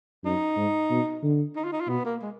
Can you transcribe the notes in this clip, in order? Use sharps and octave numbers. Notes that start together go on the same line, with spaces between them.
F#2 D#4
G#2
B2
D3
D#4
F4
D#4
F4
B2 B3
A#3
G#3